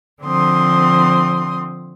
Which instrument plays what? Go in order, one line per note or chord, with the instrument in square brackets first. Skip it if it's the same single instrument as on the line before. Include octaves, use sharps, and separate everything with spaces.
[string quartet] D3 F3 C4 C6 D#6